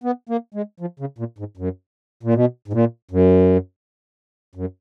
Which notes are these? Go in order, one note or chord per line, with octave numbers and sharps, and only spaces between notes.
B3
A#3
G#3
F3
C#3
A#2
G#2
F#2
A#2
B2
G#2
A#2
F#2
F#2